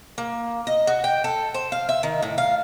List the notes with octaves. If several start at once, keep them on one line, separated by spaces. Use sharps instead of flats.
A#3
D#5
F#4
G5
A4
C5
F5
E5
D#3
A2
F5